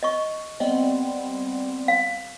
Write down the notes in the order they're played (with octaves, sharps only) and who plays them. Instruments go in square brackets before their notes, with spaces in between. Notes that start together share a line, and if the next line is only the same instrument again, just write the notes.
[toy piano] D#5 C#6
[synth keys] G3 B3 C4 [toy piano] D#5
[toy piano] F5